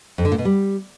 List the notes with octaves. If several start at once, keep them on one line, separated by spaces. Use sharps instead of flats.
F2
D3
A#2
B2
G3